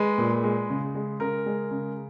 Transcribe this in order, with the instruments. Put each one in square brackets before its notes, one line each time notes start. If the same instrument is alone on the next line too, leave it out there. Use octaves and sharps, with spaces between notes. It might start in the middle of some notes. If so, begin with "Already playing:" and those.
Already playing: [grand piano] G#3 B4
A#2
G#3
C#3
G#3
C#3 A#4
G#3
C#3